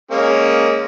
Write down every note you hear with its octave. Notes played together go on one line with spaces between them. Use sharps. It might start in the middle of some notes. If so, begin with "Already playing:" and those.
G#3 A#3 C#4